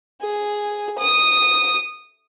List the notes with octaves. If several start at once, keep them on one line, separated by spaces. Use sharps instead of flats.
G#4
D#6